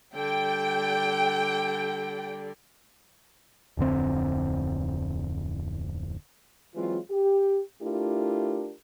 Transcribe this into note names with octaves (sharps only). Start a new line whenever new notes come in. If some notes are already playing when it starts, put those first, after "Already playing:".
D3 G3 G5
D1 F2 D3 C4
E3 F#3 G#3 C4 F4
G4
A3 D4 E4 F4 G4 A#4